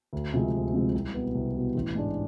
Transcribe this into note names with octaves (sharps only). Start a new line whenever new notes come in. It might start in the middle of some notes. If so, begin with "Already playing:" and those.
D2
C3 F3 G#3 C4
D2
C3 F3 G#3 C4
C2
B2 B3
C2
B2 B3
A1
G#2 G#3 D4